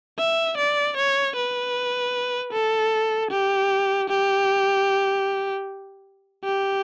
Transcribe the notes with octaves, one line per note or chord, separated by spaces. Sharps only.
E5
D5
C#5
B4
A4
G4
G4
G4